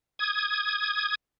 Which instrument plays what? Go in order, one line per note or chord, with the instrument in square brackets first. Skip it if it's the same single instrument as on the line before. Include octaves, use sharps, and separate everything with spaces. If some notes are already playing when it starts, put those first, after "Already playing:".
[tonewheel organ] D#6 G#6